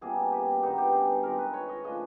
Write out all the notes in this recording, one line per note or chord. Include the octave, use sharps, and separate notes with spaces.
B2 G3 A#3 C#4 G#4
G4
G2 D#3 G3 B3 D#4
G4
G#4
D#3 G#3 C4 A#4
B4
C#5
D#5
C#3 F3 A3 D4 D#5